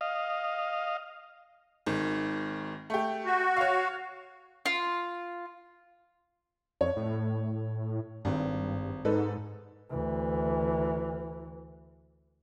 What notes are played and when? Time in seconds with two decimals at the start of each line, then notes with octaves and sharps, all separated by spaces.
0.01 D#5 F5
1.86 G#1 D#3
2.90 A3 G4
3.26 F#4
3.57 C#5 F5
4.66 F4
6.81 F2 C#5
6.97 A2
8.25 G#1 G2
9.05 G#2 D#4 A4 B4
9.90 D2 E3